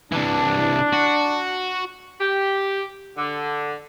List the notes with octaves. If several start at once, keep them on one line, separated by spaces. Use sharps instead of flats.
C2 E3 D4
F#4
G4
D3